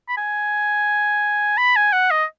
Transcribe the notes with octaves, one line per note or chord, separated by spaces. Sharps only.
B5
G#5
B5
G#5
F#5
D#5